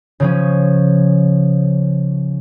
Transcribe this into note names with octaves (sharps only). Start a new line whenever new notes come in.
C#3 F3 C#4